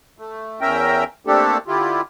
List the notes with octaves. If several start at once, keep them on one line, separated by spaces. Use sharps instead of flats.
A3
E2 C#4 A#4 E5 G5 A#5
A3 A#3 C4 D4 G4 A4
D3 E4 F4 G4